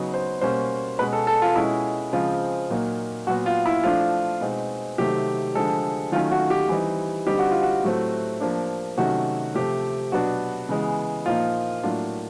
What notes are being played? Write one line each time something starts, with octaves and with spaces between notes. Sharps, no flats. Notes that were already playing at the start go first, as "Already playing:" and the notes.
Already playing: C#3 F#3 B3 D#4
C5
B2 G3 A#3 C#4 C5
B2 G#3 C#4 B4
A4
A4
F4
B2 G#3 C#4 E4
C#3 F3 G#3 C4 F4
A#2 F#3 A#3 D#4
A#2 F#3 B3 F#4
F4
E4
F3 A3 D4 F4
B2 G#3 C4 D#4
C3 D#3 F#3 A3 C4 G4
D3 F3 G#3 A4
D#3 F#3 A3 C#4 F4
F#4
G4
E3 G3 C4 D#4
D3 G3 C4 D#4 G4
F#4
F4
F#4
A2 F#3 A3 C4
F3 A#3 D4
C3 D#3 F#3 A3 C#4 F#4
C3 F3 A3 G4
B2 F#3 B3 D4 F#4
C#3 E3 G#3 B3
A#2 F3 A#3 D#4 F4
A2 F#3 A#3 D4 F4